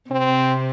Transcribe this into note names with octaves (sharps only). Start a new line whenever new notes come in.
C3 C4